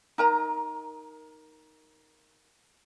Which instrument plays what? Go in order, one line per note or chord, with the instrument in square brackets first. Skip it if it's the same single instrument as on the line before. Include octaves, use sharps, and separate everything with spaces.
[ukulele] D#4 A#4 A#5